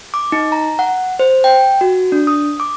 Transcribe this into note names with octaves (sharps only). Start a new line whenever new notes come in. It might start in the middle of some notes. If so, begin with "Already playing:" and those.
D6
D#4
A#5
F#5
C5
G5
F#4
D4
D#6
D6